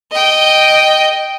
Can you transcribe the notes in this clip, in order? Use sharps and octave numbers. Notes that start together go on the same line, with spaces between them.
D#5 G5